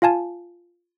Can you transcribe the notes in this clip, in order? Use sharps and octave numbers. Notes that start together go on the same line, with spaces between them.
F4 F5 G#5 A5